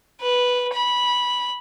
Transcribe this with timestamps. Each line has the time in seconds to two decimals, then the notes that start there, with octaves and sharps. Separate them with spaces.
0.20 B4
0.74 B5